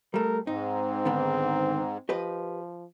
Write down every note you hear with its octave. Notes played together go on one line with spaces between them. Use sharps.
G3 A3 A#4
G#2 C4 D#4
D3 D#3 B3
F3 G4 B4 D#5